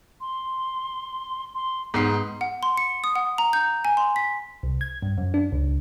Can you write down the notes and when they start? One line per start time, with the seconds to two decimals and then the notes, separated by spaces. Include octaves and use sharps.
0.20 C6
1.54 C6
1.94 G#2 B3 C6 C7
2.41 F#5
2.63 C6
2.77 C#7
3.04 D#6
3.15 F#5
3.38 A#5
3.53 G6
3.85 G#5
3.97 C6
4.16 B6
4.63 C2
4.81 G#6
5.03 G2
5.18 F#2
5.34 D4
5.52 C#2